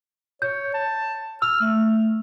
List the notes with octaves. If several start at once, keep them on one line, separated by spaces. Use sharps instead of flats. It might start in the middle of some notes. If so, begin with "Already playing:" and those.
C#5 G6
A5
E6 F6
A3